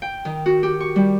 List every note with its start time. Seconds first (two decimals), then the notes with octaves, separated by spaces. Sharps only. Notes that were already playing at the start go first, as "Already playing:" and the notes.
0.02 G5
0.25 D#3
0.46 F#4
0.63 G4
0.80 C#6
0.96 G3